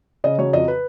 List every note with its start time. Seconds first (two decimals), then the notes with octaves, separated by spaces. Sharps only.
0.24 C#3 D#5
0.38 F#3 C#5
0.53 F2 D#5
0.68 B4